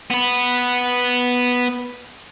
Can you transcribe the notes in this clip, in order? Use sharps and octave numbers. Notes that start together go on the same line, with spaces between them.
B3 B4